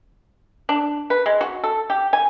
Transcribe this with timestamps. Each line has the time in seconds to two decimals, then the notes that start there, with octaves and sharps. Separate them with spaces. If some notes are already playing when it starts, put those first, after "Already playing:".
0.69 D4
1.10 B4
1.26 G#3
1.41 F#4
1.64 A4
1.90 G4
2.13 G#5